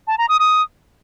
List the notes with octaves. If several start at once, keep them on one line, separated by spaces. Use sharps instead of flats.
A5
A#5
D#6
D#6